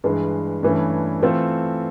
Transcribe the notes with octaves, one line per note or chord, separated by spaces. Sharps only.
G2 E3 G#3
G2 E3 A3 C#4
E3 A3 C4 F4 A4